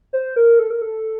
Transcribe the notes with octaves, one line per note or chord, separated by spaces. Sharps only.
C5
A#4
A4
A#4
A4